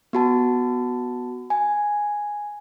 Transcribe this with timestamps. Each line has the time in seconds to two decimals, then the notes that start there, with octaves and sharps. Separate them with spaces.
0.13 B3 F#4 A5
1.50 G#5